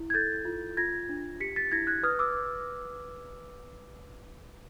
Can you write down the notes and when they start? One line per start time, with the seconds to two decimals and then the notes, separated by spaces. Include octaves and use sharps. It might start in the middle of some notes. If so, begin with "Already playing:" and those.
Already playing: E4
0.10 G#6
0.14 A4 G6 A6
0.45 F4
0.77 F4 G#6 A#6
1.09 D4
1.40 G4 B6 C#7
1.56 A6 B6
1.72 E4 G#6 A#6
1.87 F#6 G#6
2.03 B4 D#6 F6
2.19 D6 E6